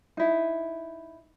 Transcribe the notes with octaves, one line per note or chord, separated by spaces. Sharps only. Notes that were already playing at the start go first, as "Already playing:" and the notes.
D#4 E4